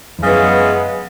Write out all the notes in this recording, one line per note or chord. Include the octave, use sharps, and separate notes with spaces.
E2
F#2 C#3 E3 G#3 B3